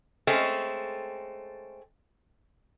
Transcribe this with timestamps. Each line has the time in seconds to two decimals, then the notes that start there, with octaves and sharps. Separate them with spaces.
0.27 G#3 A3 C4 C#4